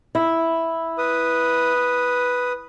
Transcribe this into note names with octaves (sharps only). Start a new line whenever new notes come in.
E4
B4 D#6